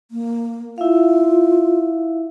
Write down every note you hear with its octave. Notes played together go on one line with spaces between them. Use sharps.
A#3
E4 F4 E5 F5